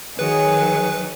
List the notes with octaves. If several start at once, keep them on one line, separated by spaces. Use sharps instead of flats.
D#3 F#3 G#4 B4